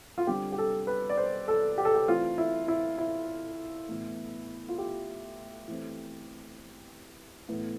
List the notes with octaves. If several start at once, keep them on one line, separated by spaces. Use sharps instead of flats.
F4
D3 G3 C4 G4
G4
A4
B4
D5
C5
A4
G4
A4
G4
E3 A3 C4 F4
E4
E4
E4
A2 E3 B3
F4
G4
E3 A3 C4
A2 E3 B3